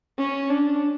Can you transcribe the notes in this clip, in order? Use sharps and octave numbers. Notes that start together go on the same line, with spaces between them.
C#4
D4